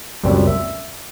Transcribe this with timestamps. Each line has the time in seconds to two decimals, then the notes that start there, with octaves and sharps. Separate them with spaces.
0.24 C#2 F#2 A#2 G3 C4
0.47 E5